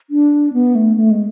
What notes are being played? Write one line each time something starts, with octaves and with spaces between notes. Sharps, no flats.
D4
B3
A3
A3
G#3